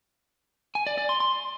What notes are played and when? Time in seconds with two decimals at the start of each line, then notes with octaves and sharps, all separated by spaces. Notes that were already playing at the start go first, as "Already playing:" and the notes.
0.75 G#5
0.87 D5
0.98 D5
1.09 C6
1.20 C6